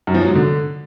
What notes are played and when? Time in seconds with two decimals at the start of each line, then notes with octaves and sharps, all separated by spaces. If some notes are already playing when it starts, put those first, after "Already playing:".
0.07 F#2
0.14 F3
0.21 F#3
0.28 G#2
0.35 D3